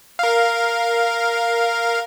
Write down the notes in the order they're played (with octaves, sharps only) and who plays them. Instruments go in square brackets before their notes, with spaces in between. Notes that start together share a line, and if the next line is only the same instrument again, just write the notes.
[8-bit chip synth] A#4 F5